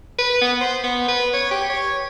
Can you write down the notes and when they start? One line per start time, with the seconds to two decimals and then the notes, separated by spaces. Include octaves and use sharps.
0.19 B4
0.41 B3
0.61 C5
0.84 B3
1.08 B4
1.33 C#5
1.51 G4
1.70 C#5